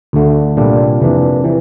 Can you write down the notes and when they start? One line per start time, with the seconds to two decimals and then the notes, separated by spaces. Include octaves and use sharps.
0.13 D2 D3 A3
0.57 C2 A#2 G3 D4 F4
1.00 F2 C3 E3 A#3 D4
1.44 C3 E3